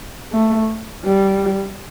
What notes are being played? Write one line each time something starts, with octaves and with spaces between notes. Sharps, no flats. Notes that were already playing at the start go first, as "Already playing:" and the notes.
A3
G3